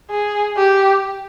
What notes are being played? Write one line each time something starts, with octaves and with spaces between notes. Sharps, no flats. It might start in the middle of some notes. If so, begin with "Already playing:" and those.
G#4
G4